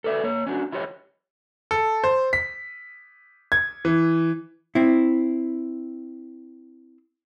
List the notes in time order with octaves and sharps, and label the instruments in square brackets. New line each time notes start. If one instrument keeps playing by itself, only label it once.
[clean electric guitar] A4 B4 D5 E5
A#3 C#5
C#4 D4 F#4
E4 F4 G4 A4 C#5 D#5
[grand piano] A4
C5
B6
G#6
E3
[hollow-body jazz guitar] C4 E4